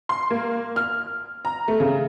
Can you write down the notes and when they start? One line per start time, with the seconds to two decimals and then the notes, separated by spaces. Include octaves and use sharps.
0.09 C6
0.30 A#3
0.76 F6
1.45 A#5
1.68 A3
1.80 C#3